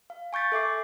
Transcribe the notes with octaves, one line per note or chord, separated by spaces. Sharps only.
F5
G#5 C#6 G6 A6 B6
A4 E5 D6 C7